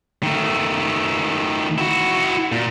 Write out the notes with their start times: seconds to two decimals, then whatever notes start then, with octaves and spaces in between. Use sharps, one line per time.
0.23 D#3 A3
1.78 E4 F#4
2.52 A#2